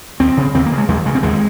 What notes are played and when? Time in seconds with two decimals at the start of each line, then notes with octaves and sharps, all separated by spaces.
0.20 D#2 C4
0.37 C#3
0.54 D#2 C4
0.66 A#3
0.72 C#3
0.78 G#3
0.88 D#2 G#3
1.06 C#3 G#3
1.15 C4
1.23 D#2 G#3